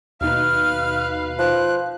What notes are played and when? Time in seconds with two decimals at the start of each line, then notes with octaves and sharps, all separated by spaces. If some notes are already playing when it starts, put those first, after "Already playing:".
0.21 D#2 B2 D#4 B4 F5 F6
1.39 F3 F#6